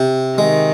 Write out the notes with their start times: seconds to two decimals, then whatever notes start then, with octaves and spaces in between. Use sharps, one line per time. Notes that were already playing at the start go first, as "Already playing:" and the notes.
Already playing: C3
0.38 D#3 G#3